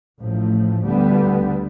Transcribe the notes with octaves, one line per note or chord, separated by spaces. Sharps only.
A1 A2 F3 A3
D2 D3 G3 B3